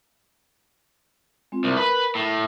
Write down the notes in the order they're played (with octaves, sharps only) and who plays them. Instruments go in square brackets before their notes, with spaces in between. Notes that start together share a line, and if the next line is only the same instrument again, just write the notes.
[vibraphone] G#3 C4 F4
[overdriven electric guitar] C2 [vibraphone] A#4
[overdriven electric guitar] B4 B5
A2